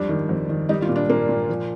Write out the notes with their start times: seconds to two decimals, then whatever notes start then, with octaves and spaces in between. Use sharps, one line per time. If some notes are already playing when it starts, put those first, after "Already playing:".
Already playing: F2 G3 D4
0.09 D#3
0.29 F2
0.49 D#3
0.69 G3 D#4
0.82 F4
0.89 A#2
0.96 D4
1.09 A#2 A#3
1.29 A#2
1.49 F3